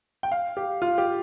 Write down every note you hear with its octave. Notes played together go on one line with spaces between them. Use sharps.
G5
F5
G4
F4
G4